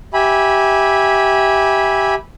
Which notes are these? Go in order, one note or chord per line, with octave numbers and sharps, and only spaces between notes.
G4 E5 G#5 B5